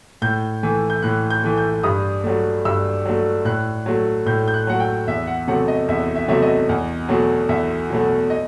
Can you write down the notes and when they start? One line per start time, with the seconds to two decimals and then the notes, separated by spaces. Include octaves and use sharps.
0.22 A2 G6
0.63 E3 A3
0.90 G6
1.03 A2 F#6
1.30 G6
1.44 E3 A3
1.58 G6
1.83 G2 D#6
2.24 F#3 A3
2.65 G2 E6
3.05 F#3 A3
3.45 A2 F#6
3.86 F#3 A3
4.26 A2 G6
4.48 G6
4.54 F#6
4.67 F#3 A3 F#5
4.80 G5
5.07 E2 E5
5.27 F#5
5.48 C3 F#3 A3 F#5
5.68 D#5
5.88 E2 E5
6.15 E5
6.28 C3 F#3 A3 E5
6.42 D#5
6.69 E2
7.09 B2 F#3 A3
7.49 E2 E5
7.90 B2 F#3 A3
8.30 D#5